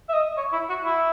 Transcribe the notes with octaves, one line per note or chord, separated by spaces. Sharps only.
E5
D#5
C#5
E4
F#4
E4